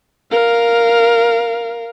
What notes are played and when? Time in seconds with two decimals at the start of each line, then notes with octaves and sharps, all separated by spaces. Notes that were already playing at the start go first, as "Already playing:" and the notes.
0.32 A#4 F5